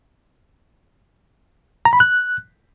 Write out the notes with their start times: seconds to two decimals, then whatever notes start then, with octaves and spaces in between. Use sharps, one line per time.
1.85 A#5
1.93 B5
2.00 F#6